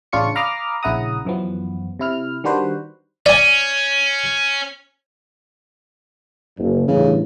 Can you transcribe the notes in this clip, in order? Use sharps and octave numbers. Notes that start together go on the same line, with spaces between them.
A1 C#3 D4 F4 C#6 C#7
F5 A#5 B5 D6 D#6 F6
A#1 C#3 E4 F#5 A#5 D#6
F#2 E3 F3 B3
C3 E4 F6
D#3 G3 D4 F#4 B4 C5
C#4 D5 G#5
F#1
G1 A2 C#3 E3